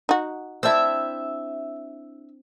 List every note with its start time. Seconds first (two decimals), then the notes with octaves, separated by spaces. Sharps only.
0.09 D#4 F#4
0.63 C4 D4 E4 E5 E6